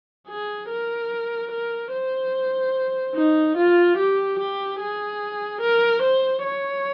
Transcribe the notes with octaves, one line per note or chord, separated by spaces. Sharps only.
G#4
A#4
A#4
C5
D#4
F4
G4
G4
G#4
A#4
C5
C#5